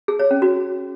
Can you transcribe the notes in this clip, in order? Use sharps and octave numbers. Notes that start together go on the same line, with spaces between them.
G#4
C#5
C#4
F#4